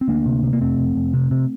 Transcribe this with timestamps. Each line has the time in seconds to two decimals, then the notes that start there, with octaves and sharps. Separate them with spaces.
0.01 C4
0.08 D2 A#3 D4
0.26 C3
0.43 C3
0.53 A#3
0.61 F1 A3 C4
0.79 F1
0.95 F1
1.14 C3
1.31 C3